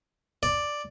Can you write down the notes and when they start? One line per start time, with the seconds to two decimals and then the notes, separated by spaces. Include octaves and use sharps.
0.43 D5